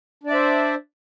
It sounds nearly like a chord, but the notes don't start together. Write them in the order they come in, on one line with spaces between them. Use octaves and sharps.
D4 D5 E5 C5